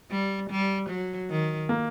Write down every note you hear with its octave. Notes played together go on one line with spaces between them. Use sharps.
G3
G3
F#3
D#3
A#3